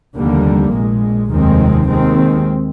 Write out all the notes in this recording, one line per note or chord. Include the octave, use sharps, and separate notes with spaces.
F1 D#2 D3 G3 A#3
A#1 A#2 G#3
F1 D#2 D#3 G#3 C4
D#2 D#3 G#3 C4